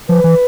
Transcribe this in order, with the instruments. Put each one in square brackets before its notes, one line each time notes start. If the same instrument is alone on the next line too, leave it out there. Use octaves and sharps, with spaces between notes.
[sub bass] F3 [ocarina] B4
[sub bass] E3